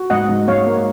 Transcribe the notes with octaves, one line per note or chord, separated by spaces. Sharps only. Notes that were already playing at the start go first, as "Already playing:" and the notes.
Already playing: F#4
G#2 D#5 F#5
G#2
G#2 C#5 F5
A#3